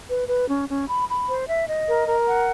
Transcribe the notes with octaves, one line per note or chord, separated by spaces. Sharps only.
B4
B4
C#4
C#4
B5
B5
C5
E5
D#5
A#4
A#4
F#5